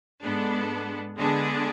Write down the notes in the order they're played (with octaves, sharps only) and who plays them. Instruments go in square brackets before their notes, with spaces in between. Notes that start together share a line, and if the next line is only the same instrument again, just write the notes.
[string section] G#2 G#3 B3 D4 A4
D3 G#3 B3 D4 G#4